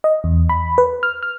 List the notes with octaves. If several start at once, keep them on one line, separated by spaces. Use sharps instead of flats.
D#5
E2
B5
B4
F6
F6